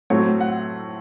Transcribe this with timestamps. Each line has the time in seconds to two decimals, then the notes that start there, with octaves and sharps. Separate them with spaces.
0.10 A2 F#3 A3 C4 C#5
0.41 F#5